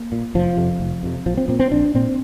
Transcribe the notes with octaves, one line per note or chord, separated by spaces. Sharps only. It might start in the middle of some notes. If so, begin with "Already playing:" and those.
Already playing: A#3
A#2
F1 F3
F2 C3
F1
F2 C3
A#1 F3
C4
A#2 C4
C4
A#1 D4
A#2 C4